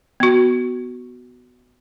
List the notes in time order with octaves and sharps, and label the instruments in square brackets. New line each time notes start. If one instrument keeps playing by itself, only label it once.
[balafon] B3 F#4